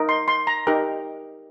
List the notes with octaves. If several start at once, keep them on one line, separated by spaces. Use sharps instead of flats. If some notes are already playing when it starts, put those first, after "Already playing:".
Already playing: D#4 A#4
C6
C6
A#5
D#4 G4 A#4